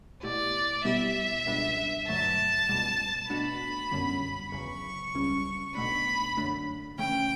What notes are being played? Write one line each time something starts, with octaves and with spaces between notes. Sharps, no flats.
B2 A3 E4 G4 D5
B2 G3 B3 E4 G4 E5
C#2 B2 G3 D4
G2 D3 F#3 A3 A5
C#2 B2 G3
B2 A3 D4 F#4 B5
G1 F#2 D3 G3 C#4
E2 C#3 F#3 C#6
C#2 C#3 G3 C#4
B1 B2 A3 D4 B5
F#2 D3 A3 D4
C#3 E3 A3 C#4 G5